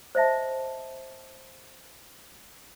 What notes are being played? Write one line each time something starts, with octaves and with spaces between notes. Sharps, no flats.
C5 D#5 E5 A5